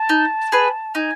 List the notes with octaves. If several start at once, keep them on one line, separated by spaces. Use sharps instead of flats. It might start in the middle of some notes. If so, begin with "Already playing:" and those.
Already playing: A5
D#4
G#4 B4
D#4 G#5